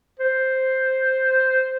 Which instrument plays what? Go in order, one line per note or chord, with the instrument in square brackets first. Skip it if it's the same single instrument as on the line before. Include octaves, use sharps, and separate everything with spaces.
[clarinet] C5